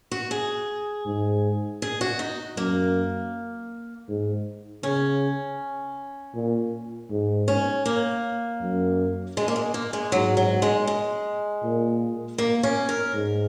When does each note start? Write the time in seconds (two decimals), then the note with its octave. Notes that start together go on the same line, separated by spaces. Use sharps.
0.11 F#4
0.31 G#4
1.06 G#2
1.82 G#4
2.01 F#4
2.19 D#4
2.57 F#2 A#3
4.08 G#2
4.83 C#3 C#4
6.34 A#2
7.10 G#2
7.48 C#4
7.86 A#3
8.61 F#2
9.37 G#3
9.48 A#3
9.56 G#3
9.74 A#3
9.93 G#3
10.12 G#2 F#3
10.37 F#3
10.62 G#3
10.87 G#3
11.63 A#2
12.38 A#3
12.63 C#4
12.89 A#4
13.14 G#2